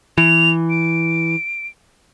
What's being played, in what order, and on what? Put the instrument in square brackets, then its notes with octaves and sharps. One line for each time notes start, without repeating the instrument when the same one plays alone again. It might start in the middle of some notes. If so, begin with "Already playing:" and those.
[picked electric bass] E3 [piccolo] F7
[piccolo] D7